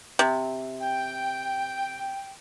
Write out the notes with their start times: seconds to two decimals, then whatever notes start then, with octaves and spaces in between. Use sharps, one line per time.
0.19 C3
0.81 G5